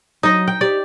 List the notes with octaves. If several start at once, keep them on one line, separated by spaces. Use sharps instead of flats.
F#3 D#4 D#5 D#6
G5
G4 D5